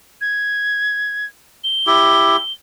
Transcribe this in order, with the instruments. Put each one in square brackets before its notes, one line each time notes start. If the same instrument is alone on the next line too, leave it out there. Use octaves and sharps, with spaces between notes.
[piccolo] G#6
G7
[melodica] E4 G4